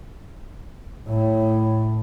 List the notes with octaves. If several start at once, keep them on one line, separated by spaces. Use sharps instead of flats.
A2